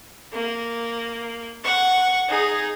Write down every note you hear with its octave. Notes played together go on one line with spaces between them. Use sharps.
A#3
F#5 C#6
D#4 G#4